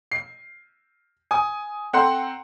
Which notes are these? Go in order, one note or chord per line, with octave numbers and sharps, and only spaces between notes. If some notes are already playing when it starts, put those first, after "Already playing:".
C7
G#5 D#6
C4 A4 F#5 A#5 C6